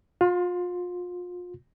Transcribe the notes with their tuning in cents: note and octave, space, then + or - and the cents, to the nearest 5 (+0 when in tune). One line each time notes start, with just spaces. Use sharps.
F4 +35 C6 +0